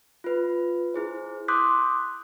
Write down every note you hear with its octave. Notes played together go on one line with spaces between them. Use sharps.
F4 B4
E4 G#4 C5
C6 D6 D#6 F#6 G6 B6